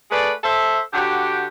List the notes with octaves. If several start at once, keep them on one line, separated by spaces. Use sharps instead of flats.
A3 G#4 B4 D5
A4 C5 E5
D3 F#4 G4